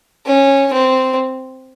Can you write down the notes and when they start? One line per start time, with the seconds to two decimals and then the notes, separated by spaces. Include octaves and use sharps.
0.26 C#4
0.73 C4